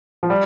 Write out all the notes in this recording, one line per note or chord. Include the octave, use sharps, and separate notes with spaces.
F3
G3